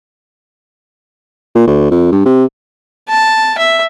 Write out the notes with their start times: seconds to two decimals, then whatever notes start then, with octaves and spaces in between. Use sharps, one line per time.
1.55 A#2
1.67 D2
1.91 F2
2.11 G2
2.25 C3
3.09 A5
3.58 E5